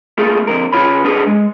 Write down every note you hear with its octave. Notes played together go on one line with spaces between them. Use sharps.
A3 A#3 F4 G#4 A4
F2 D3 A#4
C#3 F4 C#5 B5
B3 D4 G#4 A4
G#3